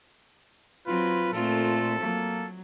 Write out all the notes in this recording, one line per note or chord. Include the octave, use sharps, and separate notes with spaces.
F#3 C4 F4 B4
A#2 A3 C4 F4 A4
F#3 A#3